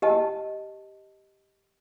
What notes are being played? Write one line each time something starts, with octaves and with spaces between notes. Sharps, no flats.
G4 D#5 A5